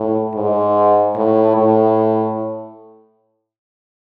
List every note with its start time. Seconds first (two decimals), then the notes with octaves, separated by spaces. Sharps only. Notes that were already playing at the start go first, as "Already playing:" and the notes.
Already playing: A2
0.35 G#2
1.16 A2
1.56 A2